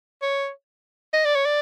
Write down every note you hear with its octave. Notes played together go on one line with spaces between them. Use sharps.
C#5
D#5
D5
C#5
D5